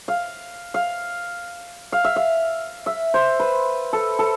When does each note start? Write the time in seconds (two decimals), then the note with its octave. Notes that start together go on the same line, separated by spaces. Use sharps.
0.08 F5
0.74 F5
1.92 F5
2.04 E5
2.16 F5
2.86 E5
3.14 C5
3.40 B4
3.93 A4
4.19 A4